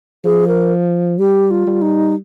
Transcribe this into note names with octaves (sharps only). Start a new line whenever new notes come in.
F3 G#4
A#4
G3 G4
F4
G3
D#4